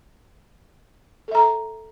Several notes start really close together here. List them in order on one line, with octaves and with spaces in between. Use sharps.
A4 E5 A#5